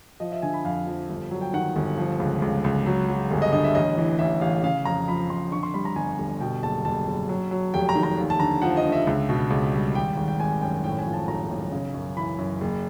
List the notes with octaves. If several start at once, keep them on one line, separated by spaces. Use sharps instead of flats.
F3 D#5
E5
D3 G#5
B5
F2 F5
F3
G1
F#3
G5
D#3 F#5
G1
F3
C#2
C#2
C#2
F#3
F#3
G1
D#5
D3 D#5
E5
A1 D#5
E3
A1 E5
A1 F5
C#3 F5
F2 A#5
F3 B5
F2 C6
D3 C#6
C6
G3 B5
A#5
G1 G#5
G1
B2 G5
F#1 A5
F#1 A5
F#1
F#3
F#3
F1 G5
A#5
D#3
A#5
D#2
A5
D3 A#5
F3 F#5
D#5
D3
E5
C#2
B2
C#2
G3
G#1 G5
G#1
G5
G#1 G#5
F#2 G5
A2 G5
G#5
F3
A5
B1 A#5
B1
C#3
F#2
E3 B5
F#2
F#1